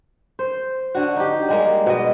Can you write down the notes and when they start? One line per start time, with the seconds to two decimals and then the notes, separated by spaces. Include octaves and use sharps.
0.39 C5
0.95 D3 F#4
1.16 D#4 G4
1.49 G3 G#3 A#3
1.86 B2 D#5